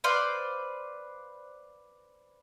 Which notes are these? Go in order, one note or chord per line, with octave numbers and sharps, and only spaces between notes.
B4 C5 D5 F5